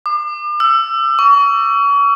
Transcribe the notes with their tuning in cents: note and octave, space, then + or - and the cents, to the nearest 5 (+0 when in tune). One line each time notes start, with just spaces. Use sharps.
D6 +40
E6 +25
C#6 +35